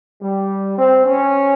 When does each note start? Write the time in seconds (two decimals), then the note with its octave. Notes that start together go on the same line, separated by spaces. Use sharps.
0.20 G3
0.77 C4
1.06 C#4